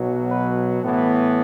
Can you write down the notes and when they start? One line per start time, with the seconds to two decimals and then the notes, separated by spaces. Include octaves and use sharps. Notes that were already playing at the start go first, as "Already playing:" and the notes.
Already playing: B1 B2 F#3
0.30 B4
0.84 A2 E3 B3